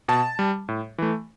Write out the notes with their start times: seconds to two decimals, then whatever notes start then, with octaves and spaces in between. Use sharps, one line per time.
0.08 B2 A5
0.39 G3
0.69 A2
0.98 E3 A3